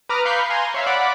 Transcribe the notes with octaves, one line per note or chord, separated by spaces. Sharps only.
B4 A#5 D6 D#6 F6
F5 B5 C#6 F#6 G6 C7
G#5 A#5 C6
C#5 E5 F5
D5 F#5 B5 D6